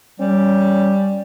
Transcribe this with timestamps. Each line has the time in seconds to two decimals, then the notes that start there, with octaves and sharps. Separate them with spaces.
0.20 G3 C#4